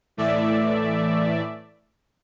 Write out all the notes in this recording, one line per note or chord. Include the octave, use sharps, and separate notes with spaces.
A2 E3 A3 D5 E5